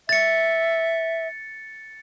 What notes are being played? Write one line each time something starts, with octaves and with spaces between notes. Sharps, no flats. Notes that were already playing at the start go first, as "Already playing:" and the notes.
E5 A6 C#7